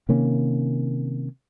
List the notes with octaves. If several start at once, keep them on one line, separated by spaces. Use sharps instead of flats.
C3 D#3 A#3 C#4